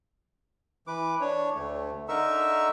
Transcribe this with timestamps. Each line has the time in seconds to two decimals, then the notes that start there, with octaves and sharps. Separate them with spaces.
0.87 E3 B4 D6
1.21 D4 C#5
1.55 D2 A3
2.09 D3 D#4 A#4 E5 C#6 E6